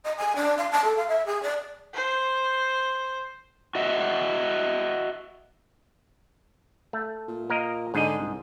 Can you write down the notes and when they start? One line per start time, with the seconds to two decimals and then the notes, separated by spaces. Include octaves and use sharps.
0.04 D#5
0.17 G#5
0.35 D4
0.57 F5
0.71 A5
0.84 A4
0.96 F5
1.08 E5
1.26 G#4
1.42 D5
1.94 C5
3.75 F#4 D#5 E5 F#5
6.93 A3
7.28 A#2
7.50 A#3 A#4 D#5
7.94 G#2 D3 G#4 D#5
8.18 C2